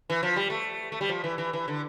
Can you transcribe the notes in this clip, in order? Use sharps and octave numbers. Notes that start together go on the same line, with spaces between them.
E3
F3
G3
A3
A3
G3
F3
E3
E3
E3
D3